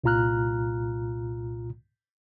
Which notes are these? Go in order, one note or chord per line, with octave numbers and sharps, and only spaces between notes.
C2 A#2 F4 A#5 F6 F#6